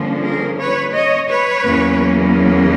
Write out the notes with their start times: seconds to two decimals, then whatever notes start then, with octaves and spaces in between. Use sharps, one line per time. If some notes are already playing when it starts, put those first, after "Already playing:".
Already playing: G2 D3 F3 A#3 C#4
0.24 G#4 A#4
0.59 B4 C#5
0.94 C#5 D#5
1.29 B4 C#5
1.64 E2 C#3 F#3 A#3 C#4